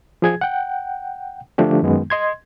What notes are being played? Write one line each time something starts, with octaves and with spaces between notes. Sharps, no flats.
F3 G#4 G#6
F#5 G5
D3 F3 A3 D4 G4
F#2 D#3 G#3 B3
D#5 C6 G#6